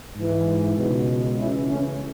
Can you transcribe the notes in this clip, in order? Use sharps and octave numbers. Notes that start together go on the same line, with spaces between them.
G#2 E3
C#2 B2
C#2 C#3 E3 C#4 E4
A3 C#4